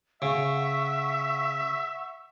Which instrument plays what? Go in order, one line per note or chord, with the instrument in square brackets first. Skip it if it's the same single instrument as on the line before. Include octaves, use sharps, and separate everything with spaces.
[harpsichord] C#3 [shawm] E5 [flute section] F#5 C#6